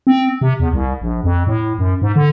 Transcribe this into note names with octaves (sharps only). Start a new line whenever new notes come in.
C4
C3
E2
C2
A#1
F2
A2
F#2
G#2
D3